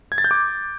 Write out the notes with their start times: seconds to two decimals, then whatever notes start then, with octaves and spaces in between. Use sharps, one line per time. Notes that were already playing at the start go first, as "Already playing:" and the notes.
0.12 G#6
0.18 A6
0.24 G6
0.31 D6